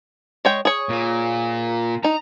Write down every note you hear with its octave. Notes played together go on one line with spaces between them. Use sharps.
G#3 C#5 G5
G#4 C#5
A#2
D#4 A#5